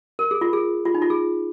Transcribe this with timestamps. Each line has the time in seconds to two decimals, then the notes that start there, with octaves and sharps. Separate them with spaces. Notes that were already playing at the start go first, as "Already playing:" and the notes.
0.19 A#4
0.31 G#4
0.41 F4
0.53 G#4
0.85 F4
0.95 D#4
1.02 F4
1.10 G#4